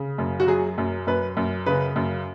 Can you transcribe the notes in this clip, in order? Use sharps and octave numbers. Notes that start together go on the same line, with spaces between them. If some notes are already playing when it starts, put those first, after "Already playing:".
Already playing: C#3
F#2
F#4
F#3 G#4
F#2
F#2 B4
F#2
C#3 B4
F#2